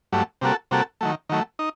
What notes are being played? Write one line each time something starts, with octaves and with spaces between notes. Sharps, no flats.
G2 F#3 A3
C3 G3 A#3 F#4 A4
C3 G3 A#3 F#4 A4
D#3 F#3 A3
D#3 F#3 A3
D#4